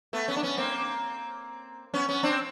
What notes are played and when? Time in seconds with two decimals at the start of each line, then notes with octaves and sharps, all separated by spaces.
0.13 A3 B3
0.28 B3 C#4
0.36 D4
0.43 B3 C#4
0.57 A#3 C4
1.94 B3 C#4
2.08 B3 C#4
2.23 C4 D4